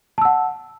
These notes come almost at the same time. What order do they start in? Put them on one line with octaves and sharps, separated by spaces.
A5 E6 F#5